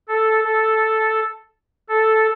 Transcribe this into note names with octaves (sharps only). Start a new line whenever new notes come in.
A4
A4
A4